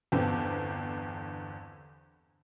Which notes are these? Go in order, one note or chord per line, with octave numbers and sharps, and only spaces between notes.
G1 E2 D3 C4